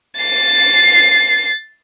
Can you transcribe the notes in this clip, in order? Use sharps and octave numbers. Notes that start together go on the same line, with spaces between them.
A6 C7